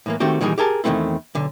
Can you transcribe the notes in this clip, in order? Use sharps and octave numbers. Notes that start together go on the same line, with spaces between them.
A2 E3 A#3
D#3 A3 C4 F#4 G4
A#2 D#3 E3 G3 D#4 G#4
G4 G#4 A#4 A5
E2 D#3 F3 A3 C4 E4
B1 D3